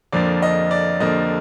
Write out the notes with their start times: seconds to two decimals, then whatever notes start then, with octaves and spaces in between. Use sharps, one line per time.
0.12 F2 D3 F3 A#3 D5
0.42 D#5
0.71 D5
1.00 F2 D3 F3 A#3 D#5